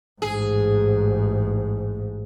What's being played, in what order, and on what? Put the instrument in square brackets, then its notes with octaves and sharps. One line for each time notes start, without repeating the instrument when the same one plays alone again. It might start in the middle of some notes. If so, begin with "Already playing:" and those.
[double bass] A1 G#2 [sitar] G#4